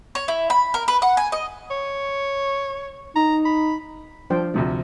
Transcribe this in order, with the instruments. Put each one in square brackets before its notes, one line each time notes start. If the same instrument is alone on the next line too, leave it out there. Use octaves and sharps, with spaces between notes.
[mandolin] C#5
E4
B5
A#4
B4
F#5
G#5
D#5
[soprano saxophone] C#5
[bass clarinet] D#4 [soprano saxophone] A#5
[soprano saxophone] B5
[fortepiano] F3 [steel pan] D4 C5 G5
[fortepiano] D2 C3 F3 [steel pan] A3